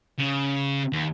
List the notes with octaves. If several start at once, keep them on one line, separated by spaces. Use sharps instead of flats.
C#3
D#2